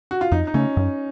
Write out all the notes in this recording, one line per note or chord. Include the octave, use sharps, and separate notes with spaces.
F#4
F4
F2 D#4
D#4
C#3 A3 C#4
F#2